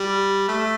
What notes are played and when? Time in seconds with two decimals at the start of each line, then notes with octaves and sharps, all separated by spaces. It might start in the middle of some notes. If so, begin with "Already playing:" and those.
Already playing: G3
0.48 A3